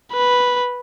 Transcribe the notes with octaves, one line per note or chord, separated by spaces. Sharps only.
B4